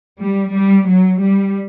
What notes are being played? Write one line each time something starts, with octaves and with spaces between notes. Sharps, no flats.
G3
G3
F#3
G3